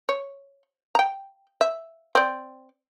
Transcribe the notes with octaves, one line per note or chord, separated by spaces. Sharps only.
C#5
G5 A#5
E5
C4 D5